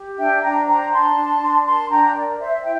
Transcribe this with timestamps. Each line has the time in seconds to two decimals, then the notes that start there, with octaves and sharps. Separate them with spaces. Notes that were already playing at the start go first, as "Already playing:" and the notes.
Already playing: G4
0.18 D4 E5 G5
0.42 D4 G5 A#5
0.67 C5 G5 A#5
0.92 D4 A5 C6
1.16 D4
1.41 D4
1.65 A#4 A5 C6
1.90 D4 G5 A#5
2.15 A#4 D5
2.39 C5 E5
2.63 E4 E5 G5